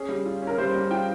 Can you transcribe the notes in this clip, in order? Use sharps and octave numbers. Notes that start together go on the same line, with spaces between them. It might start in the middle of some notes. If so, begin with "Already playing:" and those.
Already playing: C#4 G#4
G3
F4
C#4
A#4
G3 C5
G3
F4 G5